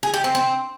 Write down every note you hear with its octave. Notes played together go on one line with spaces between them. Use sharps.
G#4
G4
C4
C4